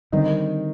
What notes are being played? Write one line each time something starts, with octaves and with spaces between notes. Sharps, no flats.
D3 D#3 G3 C4 D#4